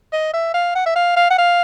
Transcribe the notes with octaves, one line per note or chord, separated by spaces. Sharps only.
D#5
E5
F5
F#5
E5
F5
F5
F#5
F5